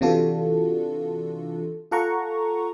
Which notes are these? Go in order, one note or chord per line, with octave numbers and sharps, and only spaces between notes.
C3 E3 D4 F4 F#4 A4
F4 A4 F#5 A#5 C#6